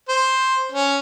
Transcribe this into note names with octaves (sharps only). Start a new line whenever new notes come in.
C5
C#4